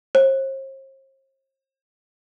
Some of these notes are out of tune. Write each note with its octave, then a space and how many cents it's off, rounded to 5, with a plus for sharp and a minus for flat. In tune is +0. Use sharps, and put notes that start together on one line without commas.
C5 +40